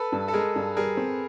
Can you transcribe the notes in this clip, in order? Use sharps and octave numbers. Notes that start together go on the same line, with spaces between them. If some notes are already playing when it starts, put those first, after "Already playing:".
Already playing: A4 B4
G2
A4
G#3 G#4 A#4
G2
G3 G#4 A#4
C4